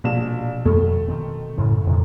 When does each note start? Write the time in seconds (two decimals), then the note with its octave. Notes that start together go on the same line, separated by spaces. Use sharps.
0.04 A#1 B2 E7
0.65 F2 D#3 A3
1.08 D#3 C4
1.57 F#2 A2 C#3
1.87 F2 A2 C3 D#3